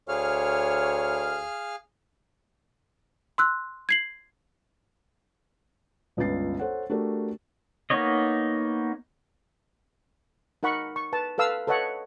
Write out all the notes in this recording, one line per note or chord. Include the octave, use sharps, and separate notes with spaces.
D2 G#4 C#5 F5 F6
C6 E6 F#6
G#6 C7 F#7
G1 C#2 C#4 B4 A6 C7
A4 C5 C#5 F#5
A3 D4 F#4 G4 A4 A#4
A#3 B3 D#4 C#5 D#5
D#4 A#4 F#5 B5 C#6
C#6
B4 A5
A4 B4 F5 E6
A4 B4 C#5 D#5 F#5